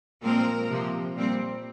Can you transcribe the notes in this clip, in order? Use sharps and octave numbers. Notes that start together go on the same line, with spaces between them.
A#2 F3 G#3 A#3 C4 A#4
C3 F3 A#3
A#2 G3 C4